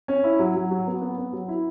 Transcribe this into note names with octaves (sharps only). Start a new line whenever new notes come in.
C#4
E4
F#3
F#3
F#3
B3
B3
B3
F#3
E4